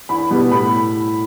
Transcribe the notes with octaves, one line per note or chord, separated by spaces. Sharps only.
E2 B5
B2 G3 B3
A2 B5